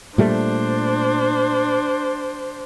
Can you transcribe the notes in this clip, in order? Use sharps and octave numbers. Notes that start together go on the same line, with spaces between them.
A#2 G3 A3 D4 C5